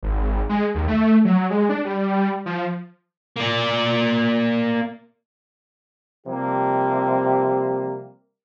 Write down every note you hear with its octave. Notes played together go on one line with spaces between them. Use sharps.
G#1
G#3
D#2
A3
F#3
G#3
D4
G3
F3
A#3 D5
C3 F3 G3 A#3 C4 G4